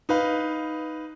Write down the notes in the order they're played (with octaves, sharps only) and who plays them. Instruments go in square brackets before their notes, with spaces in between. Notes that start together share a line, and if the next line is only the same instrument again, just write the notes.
[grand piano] D#4 B4 F5